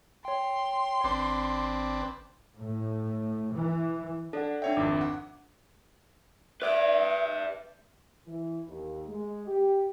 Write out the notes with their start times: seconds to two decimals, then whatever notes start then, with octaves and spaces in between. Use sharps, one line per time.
0.25 C#5 G5 C6
1.04 G#1 C4 D4 B4 D6
2.57 A2
3.52 E3
4.33 D4 A4 D5 F#5
4.62 D4 D#4 C#5 E5 G5
4.77 G#1 F2 D6
5.01 F#5
6.62 B4 D5 E5
8.26 E3
8.68 D#2
9.07 G#3
9.47 G4